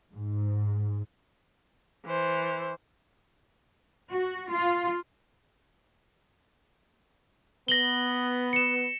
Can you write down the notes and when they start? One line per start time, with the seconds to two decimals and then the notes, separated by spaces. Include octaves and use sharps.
0.13 G#2
2.06 E3 C5
4.11 F#4
4.51 F4
7.68 B3 A#6 F#7 G7
8.53 C#7 E7